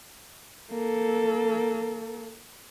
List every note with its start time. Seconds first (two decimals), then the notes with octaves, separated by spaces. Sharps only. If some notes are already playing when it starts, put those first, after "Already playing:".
0.71 A#3 A4